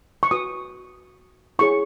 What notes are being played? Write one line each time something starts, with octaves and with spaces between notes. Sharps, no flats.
C#6
F#4 B4 D#6
E4 G#4 C#5 C#6